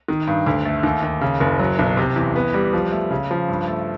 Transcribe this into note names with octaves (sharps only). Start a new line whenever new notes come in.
D#3
G2
D2
A3
D#2
D#2
C#3
F#1
F#3
B1
C3
E2
B3
G3
F3
A3
C#3
F3
G2
A3